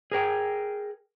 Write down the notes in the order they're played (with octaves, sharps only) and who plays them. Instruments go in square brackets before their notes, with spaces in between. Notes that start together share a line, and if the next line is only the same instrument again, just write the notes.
[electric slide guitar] G#4 A#4 G5